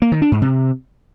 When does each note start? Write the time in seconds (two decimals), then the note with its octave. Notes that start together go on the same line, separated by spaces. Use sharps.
0.02 A#3
0.12 D#3
0.22 D4
0.32 G#2
0.42 C3